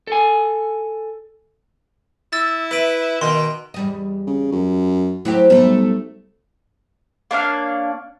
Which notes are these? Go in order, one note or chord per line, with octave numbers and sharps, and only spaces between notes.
A4 G#5
E4 E6 A6
B4 E5 D7
B2 D#3 C6
E2 G3 D#5
C#3
F#2
A2 F#3 C4 G4
B1 G3 A3
A#3 D4 C#5 F5